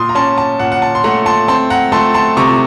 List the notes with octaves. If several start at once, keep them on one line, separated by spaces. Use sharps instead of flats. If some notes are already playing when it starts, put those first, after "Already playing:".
Already playing: A#2 C6 D#6
A#5
C#4 A5 C6
A5
A#2 F#5
F#5
A5
C6
A3 F#5 A#5
A5 C6
C4 A5 C6
F#5 A#5
A3 A5 C6
A5 C6
C3 A#5 C#6